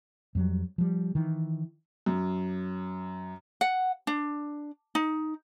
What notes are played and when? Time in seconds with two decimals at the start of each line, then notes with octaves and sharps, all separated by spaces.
0.35 F2 F#3 G3
0.78 F3 G3
1.15 D#3 E3
2.06 F#2
3.61 F#5
4.07 D4
4.95 D#4